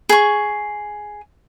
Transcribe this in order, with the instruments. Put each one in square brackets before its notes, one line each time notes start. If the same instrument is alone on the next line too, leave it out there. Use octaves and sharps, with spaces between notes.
[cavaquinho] G#4 C#6